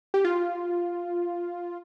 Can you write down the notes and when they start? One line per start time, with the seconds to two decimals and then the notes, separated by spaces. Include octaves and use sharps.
0.14 G4
0.25 F4